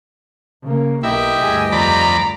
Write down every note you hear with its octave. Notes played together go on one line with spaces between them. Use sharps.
C#3 A#3
B1 A#3 E4 G4 D#5 G5
D2 G2 G#4
F2 D5 A#5 B5